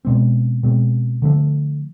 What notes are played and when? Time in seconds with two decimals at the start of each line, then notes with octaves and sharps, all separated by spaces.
0.05 B2 G#3 C4
0.63 B2 G#3 C4
1.22 D3 F3 A3